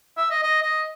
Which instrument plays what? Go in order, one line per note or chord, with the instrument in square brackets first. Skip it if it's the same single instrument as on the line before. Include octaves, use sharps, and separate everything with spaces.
[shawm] E5
D#5
D#5
D#5